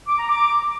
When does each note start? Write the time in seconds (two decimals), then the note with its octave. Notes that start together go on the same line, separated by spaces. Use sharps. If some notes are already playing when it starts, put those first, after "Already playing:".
0.09 D6
0.19 A#5
0.29 D6